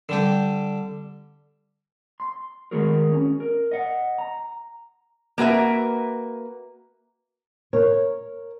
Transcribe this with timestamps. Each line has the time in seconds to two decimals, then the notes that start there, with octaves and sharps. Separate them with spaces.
0.09 D3 G3 G4
2.20 C6
2.71 D#3 G#3 F#4 G#4 A#4
3.12 C#4
3.40 A#4
3.71 D#5 F#5
4.18 A#5
5.38 A#3 F#4 B4 E5
7.73 A#4 C#5